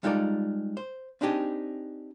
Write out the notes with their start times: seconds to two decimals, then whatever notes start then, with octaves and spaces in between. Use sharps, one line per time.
0.03 G3 G#3 D#4 F4 A4 D5
0.77 C5
1.21 C4 D4 D#4 G4 G#4